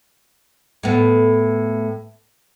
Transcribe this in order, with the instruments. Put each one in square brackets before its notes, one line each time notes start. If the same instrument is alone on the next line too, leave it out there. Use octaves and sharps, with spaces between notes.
[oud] A2 B3